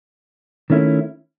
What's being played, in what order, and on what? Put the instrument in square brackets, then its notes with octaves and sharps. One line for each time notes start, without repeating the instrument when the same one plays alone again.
[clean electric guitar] D#3 A3 C#4 E4